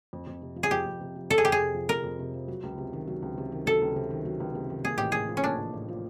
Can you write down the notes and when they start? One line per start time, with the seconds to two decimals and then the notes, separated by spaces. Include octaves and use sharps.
0.13 F2
0.27 F2
0.42 C3
0.56 F3
0.63 G#4
0.71 F2 G4
0.86 F2
1.01 C3
1.16 F3
1.30 F2 A4
1.38 G#4
1.45 F2 G4
1.52 G#4
1.60 C3
1.74 F3
1.89 F2 A#4
2.04 F2
2.19 C3
2.34 F3
2.48 F#3
2.63 C#2
2.78 C3
2.93 D#3
3.07 F#3
3.22 C#2
3.38 C3
3.52 D#3
3.66 F#3 A4
3.81 C#2
3.96 C3
4.10 D#3
4.25 F#3
4.40 C#2
4.55 C3
4.70 D#3
4.84 A#3 G#4
4.98 A1 G4
5.12 A2 G#4
5.29 F3
5.37 C#4
5.43 A#3 D4
5.58 A1
5.73 A2
5.88 F3